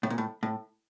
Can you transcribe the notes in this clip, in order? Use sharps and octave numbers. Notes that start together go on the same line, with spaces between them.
A2
A#2
A2
A2